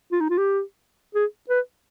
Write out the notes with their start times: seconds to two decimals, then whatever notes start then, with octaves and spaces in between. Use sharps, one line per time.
0.12 F4
0.20 D#4
0.30 F4
0.38 G4
1.15 G#4
1.49 B4